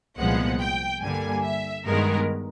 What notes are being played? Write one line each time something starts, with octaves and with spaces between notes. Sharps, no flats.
C2 A#2 F3 G#3 B3 F#5
G5
G2 D3 G3 A#3 G#5
E5
G2 D#3 G#3 B3 A#4